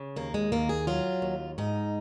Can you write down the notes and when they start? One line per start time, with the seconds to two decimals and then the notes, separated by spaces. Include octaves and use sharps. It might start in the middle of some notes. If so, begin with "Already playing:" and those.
Already playing: C#3
0.16 D#2 A#3
0.34 G#3
0.52 D#2 A#3
0.69 G#4
0.87 F#3 F4
1.22 D#2
1.58 G#2 D#4